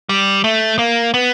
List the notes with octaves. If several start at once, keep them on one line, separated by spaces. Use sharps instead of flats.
G3
A3
A#3
B3